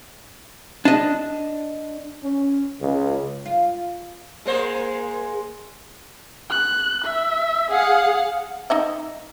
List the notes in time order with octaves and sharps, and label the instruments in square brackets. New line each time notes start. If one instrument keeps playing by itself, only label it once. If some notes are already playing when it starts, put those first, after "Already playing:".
[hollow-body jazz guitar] D4 D#5
[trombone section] C#4
C#2
[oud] F4
[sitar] G#3 A#3 C5
[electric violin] F#6
E5
[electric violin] G#4 [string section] F5 F#5
[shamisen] D#4 D#5 E5